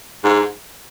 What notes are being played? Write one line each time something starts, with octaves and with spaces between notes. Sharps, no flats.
G#2